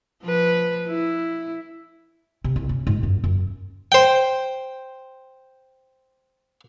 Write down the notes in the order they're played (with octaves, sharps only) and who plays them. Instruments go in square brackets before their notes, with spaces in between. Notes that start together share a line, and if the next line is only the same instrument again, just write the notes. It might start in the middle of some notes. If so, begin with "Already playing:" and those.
[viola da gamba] F3 B4
E4
[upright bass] C3
C2
C#4
G#2
F#2
F#2
[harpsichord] C5 G5